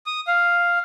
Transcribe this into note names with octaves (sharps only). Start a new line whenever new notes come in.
D#6
F5